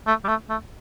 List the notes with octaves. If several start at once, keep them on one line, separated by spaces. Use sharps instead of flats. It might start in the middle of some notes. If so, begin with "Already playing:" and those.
A3
G3
A3
A3